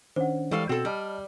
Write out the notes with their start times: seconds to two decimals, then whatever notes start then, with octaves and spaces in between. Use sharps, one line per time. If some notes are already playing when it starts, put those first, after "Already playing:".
0.16 D#3 C#4 D4 C5 F#5
0.51 E3 G3 G#3 A4 F5 C#6
0.69 B2 C4 F#4 A4
0.85 G3 D#5 A5 F6